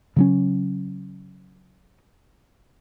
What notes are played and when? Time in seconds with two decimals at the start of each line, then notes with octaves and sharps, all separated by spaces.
0.16 C#3 F#3 C#4